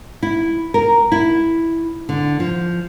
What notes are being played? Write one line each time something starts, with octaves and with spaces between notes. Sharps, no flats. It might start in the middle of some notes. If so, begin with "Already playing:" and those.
E4
A#4
E4
D3
F3